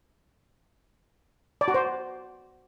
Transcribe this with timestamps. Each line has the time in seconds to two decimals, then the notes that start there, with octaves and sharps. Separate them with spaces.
1.61 D5
1.68 F#4
1.74 C5